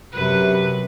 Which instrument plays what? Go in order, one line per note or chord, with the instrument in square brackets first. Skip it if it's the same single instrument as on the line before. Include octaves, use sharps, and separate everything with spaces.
[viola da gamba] F#2 B4 [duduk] C3